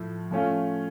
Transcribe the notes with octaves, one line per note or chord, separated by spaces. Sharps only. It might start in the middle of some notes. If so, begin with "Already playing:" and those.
Already playing: A2 F3 A3
F3 A3 C#4 F4